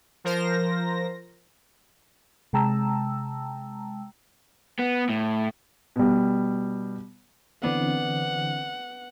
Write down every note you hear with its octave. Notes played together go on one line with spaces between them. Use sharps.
F3 A#4 C5 A#6
C3 G#3 G5 A5 A#5 E6
B3
A2
B2 G3
D3 E3 B3 C4 D4 F#5